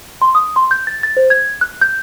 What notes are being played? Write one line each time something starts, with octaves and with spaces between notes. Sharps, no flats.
C6
D#6
C6
G6
A6
A6
C5
G#6
F#6
G6